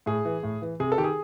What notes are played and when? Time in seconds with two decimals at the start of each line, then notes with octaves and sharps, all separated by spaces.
0.06 A2 G#4
0.25 E3
0.43 A2
0.62 E3
0.80 C3 G#4
0.92 A4
0.98 D#3 G4
1.04 G#4